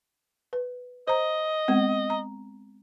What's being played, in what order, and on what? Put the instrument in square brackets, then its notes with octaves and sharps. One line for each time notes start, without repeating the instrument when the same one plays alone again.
[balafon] B4
[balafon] C5 A#5 [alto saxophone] D#5
[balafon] G#3 B3 C4
A#5